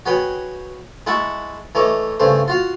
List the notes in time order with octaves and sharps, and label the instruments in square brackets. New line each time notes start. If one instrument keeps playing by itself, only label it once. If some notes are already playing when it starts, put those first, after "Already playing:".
[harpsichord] F#4 G#4 B4 C#5 G5
G#3 E4 F#5 A5 C#6
E3 A3 C#5 D#5 D6
G2 C#3 A3 C5
F4 F#4 F5